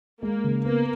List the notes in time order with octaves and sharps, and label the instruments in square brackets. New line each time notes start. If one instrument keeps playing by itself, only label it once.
[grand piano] G#3 [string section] A#3
[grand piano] C#3
[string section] A#3 [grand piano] B3